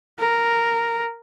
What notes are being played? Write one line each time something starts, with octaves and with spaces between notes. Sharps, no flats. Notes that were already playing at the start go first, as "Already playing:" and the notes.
A#4